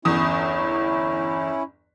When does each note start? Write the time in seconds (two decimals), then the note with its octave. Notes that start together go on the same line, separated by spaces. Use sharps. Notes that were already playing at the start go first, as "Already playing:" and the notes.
0.05 G1 E2 C#4 E4 D#6